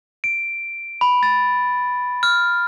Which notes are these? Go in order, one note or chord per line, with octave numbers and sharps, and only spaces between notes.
D7
B5
A6
F6